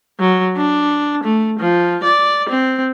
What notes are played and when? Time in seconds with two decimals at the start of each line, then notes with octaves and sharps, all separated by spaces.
0.19 F#3
0.57 D4
1.24 A3
1.59 F3
2.04 D5
2.49 C4